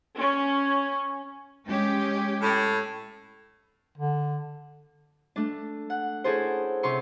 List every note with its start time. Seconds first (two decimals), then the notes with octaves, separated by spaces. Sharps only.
0.18 C#4
1.66 G#3 C#4 G4
2.42 A2
3.98 D3
5.36 A3 D4
5.90 F#5
6.24 C#4 E4 G#4 A4 C5
6.83 C3 C#4 C6 C#6